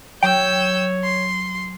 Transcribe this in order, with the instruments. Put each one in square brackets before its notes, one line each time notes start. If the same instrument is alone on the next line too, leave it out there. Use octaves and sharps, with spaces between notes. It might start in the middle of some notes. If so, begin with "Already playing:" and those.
[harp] F#3 [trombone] C#5 [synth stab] G5 [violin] E6 G6
[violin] C6